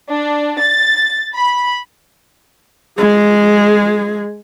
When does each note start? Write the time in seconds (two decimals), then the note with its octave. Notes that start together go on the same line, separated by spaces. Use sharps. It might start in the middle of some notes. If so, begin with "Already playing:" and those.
0.11 D4
0.60 A6
1.34 B5
2.98 G#3 G#4